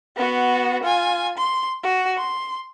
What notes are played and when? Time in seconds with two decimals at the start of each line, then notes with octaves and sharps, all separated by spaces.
0.17 B3 F#4
0.83 F4 G#5
1.38 C6
1.83 F#4
2.17 C6